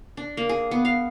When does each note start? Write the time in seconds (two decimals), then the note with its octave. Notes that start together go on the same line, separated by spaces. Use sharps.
0.17 D4
0.37 A#3
0.49 G#4
0.71 B3
0.85 F5